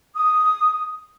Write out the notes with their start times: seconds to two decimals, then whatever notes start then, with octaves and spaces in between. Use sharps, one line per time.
0.13 D#6